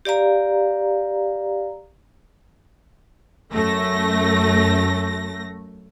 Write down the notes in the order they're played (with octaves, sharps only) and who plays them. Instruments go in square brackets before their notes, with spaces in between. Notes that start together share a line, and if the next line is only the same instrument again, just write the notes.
[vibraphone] G4 D5 F5 A#5
[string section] F#2 A3 A#6